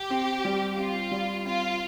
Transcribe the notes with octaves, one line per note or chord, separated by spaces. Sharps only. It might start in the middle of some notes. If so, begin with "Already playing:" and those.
Already playing: G4
C4
G3
C4 F4
G3
C4 F4